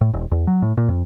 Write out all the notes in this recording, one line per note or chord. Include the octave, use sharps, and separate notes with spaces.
A2
E1
E2
F#3
A2
A#2
F2